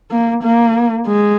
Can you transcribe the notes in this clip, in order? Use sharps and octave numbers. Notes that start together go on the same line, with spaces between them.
A#3
A#3
G#3